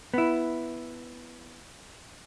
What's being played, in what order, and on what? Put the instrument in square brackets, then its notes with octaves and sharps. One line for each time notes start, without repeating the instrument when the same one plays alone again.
[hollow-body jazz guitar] B3 E4